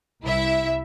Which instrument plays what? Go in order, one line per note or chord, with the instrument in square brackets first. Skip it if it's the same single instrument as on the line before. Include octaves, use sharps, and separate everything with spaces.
[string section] C2 E4 E5